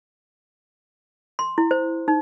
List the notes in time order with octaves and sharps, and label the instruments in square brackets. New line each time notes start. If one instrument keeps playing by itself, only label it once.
[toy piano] C6
E4
C5
D#4